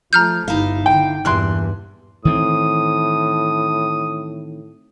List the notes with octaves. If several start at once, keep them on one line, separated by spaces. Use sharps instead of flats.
F3 A3 A#5 F6 G6
G1 G2 D#4 E4 F5
D3 G5
E2 G2 A#2 E3 C6 F#6
A2 D#3 E3 C4 D#6